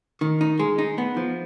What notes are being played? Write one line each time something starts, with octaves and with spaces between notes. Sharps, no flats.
D#3
D#4
G#3
D#4
B3
F3